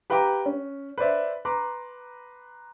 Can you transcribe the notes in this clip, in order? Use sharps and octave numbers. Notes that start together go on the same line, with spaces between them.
G4 B4 F5 G5 A#5 D6
C#4
B4 C5 D5 E5
B4 A#5 C6 D6